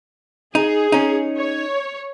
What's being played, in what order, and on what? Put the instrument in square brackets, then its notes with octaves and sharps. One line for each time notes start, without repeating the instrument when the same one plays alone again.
[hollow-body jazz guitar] D#4 [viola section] G#4
[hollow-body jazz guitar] C#4 D#4
[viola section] C#5